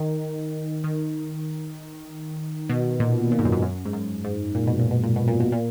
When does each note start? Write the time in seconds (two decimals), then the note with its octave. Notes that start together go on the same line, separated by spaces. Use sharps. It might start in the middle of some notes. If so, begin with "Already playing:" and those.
Already playing: D#3
0.84 D#3
2.69 B2
3.00 A#2
3.32 A#2
3.39 G#2
3.45 F#2
3.52 G#2
3.62 F#2
3.85 G#2
3.93 F#2
4.24 G#2
4.55 A#2
4.67 B2
4.79 A#2
4.91 B2
5.03 A#2
5.16 B2
5.28 A#2
5.40 B2
5.52 A#2